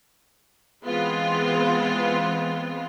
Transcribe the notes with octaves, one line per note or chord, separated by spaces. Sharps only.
E3 G#3 B3 C4 F4